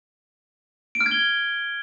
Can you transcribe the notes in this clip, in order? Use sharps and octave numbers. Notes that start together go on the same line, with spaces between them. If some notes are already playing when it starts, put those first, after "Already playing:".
D7
F6
G#6
G7